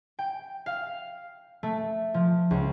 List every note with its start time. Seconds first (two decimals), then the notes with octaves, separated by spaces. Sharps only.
0.19 G5
0.66 F5
1.63 A3
2.14 F3
2.51 C#2